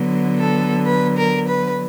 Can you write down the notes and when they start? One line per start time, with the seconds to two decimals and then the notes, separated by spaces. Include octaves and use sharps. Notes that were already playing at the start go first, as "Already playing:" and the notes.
Already playing: D3 F#3 B3
0.39 A4
0.85 B4
1.17 A#4
1.48 B4